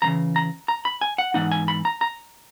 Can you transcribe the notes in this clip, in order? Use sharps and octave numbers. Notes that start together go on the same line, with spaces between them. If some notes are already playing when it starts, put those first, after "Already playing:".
E2 C#3 E3 A#5
A#5
A#5
B5
G#5
F#5
G#2 E3 B3 D#4 F#5
G#5
B5
A#5
A#5